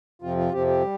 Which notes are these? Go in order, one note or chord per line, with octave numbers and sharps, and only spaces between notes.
F2 C3 F3 C4 F4
F4
F2 C3 F3 C4 G4
G4
G3